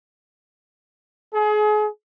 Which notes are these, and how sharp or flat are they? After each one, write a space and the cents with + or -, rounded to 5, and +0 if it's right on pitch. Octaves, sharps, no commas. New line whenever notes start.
G#4 +35